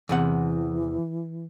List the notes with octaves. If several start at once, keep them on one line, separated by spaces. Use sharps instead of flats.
E2 C3 E3 F#5